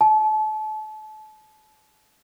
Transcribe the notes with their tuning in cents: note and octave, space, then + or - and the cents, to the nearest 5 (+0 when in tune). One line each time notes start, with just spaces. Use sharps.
A5 -35